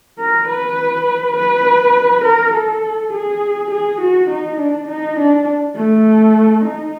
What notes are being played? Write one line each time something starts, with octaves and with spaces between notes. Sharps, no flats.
A#4
B4
B4
A#4
A4
G#4
G#4
F#4
D#4
D4
D#4
D4
A3
D#4